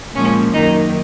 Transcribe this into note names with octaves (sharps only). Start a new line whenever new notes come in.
A#2 F3 G#3 C#4
F#2 D#3 A#3 D#4